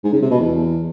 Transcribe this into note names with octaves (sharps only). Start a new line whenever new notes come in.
G#2
C#3
C3
B2
E2